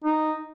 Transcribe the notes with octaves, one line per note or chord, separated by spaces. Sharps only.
D#4